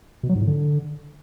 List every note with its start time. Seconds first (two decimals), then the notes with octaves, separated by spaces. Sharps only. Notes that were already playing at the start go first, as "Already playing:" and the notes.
0.23 B2
0.29 F#3
0.35 G#2
0.41 A2
0.47 D3